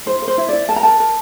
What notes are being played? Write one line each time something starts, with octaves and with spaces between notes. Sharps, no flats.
E4 C5
A#4
C5
E4
E4 D5
A#4 A5
A#5
A#4 A5
A#4